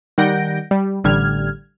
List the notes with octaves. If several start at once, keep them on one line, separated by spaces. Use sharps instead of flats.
D#3 G3 F#5 G6 A#6 D7
G3
A1 D3 G3 F6 G#6